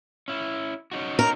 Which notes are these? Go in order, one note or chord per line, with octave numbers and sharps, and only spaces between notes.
C#4 E4
C#4 D#4 F#4
A#4